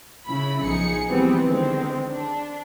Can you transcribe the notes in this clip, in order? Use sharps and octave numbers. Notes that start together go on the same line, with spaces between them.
C#3 E4 B5
B1 F3 D#4 G#4 C#7
E3 F3 G3 G#3 B3 C4
D3 D#3 G#3 C4
D4